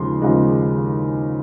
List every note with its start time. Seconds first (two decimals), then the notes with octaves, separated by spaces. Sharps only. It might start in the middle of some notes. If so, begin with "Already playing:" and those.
Already playing: D#2 C#3 F3 G#3 C6
0.22 D#2 C#3 F3 G#3